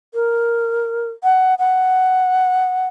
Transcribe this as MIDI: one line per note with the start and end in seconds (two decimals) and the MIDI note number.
0.14 1.10 70
1.23 1.55 78
1.59 2.87 78